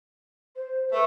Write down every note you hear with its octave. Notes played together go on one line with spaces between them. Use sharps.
C5
A3 B4